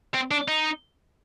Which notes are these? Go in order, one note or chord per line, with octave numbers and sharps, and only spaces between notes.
C4
D4
D#4